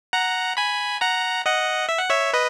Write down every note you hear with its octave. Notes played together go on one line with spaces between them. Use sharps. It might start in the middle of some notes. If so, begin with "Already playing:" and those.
F#5 A#5
G#5 B5
F#5 A#5
D#5 F#5
E5
F#5
C#5 E5
B4 D#5